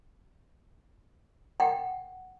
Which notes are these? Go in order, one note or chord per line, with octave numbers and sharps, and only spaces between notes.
F#5 G5